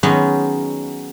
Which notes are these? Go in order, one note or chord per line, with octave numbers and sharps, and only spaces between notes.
D#3 F#3 G#3 B3 C#4 D#4